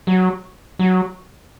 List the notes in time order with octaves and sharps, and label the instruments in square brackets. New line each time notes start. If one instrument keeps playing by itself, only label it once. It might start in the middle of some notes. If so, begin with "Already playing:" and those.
[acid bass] F#3
F#3